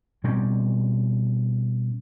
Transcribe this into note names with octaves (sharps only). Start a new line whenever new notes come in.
B2 G3 C4 C#4